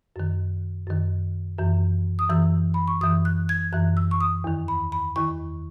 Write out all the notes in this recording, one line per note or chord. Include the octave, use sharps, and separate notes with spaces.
F#2 D#3
F#2 D#3
F#2 E3
D#6
F#2 E3 E6
B5
C#6
F#2 E3 D#6
F#6
G#6
F#2 E3 F#6
E6
C#6
D#6
E2 D#3
B5
B5
E2 D#3 C#6